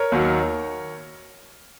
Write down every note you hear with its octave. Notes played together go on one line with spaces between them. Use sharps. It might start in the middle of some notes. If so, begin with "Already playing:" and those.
Already playing: A#4 C#5
D#2 D#3 F#3